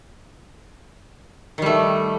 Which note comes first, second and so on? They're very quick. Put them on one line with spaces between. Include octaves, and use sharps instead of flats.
D#3 G3 A3